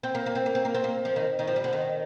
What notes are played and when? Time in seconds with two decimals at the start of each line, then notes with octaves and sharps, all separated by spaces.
0.03 C4
0.15 A#3
0.26 A#3
0.35 C4
0.46 A#3
0.55 C4
0.65 A#3
0.74 C4
0.84 A#3
1.05 F3
1.16 D#3
1.39 D#3
1.47 F3
1.56 G3
1.64 D3
1.73 D#3